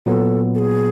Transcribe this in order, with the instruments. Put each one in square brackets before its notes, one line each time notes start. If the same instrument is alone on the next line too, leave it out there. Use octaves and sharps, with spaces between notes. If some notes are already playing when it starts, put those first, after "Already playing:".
[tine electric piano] A#2 F#3 B3 [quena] A4
[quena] A4
G#4